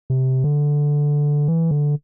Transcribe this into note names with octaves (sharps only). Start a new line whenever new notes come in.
C3
D3
E3
D3